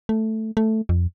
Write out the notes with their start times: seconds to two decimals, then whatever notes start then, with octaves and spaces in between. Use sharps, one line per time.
0.09 A3
0.57 A3
0.89 F2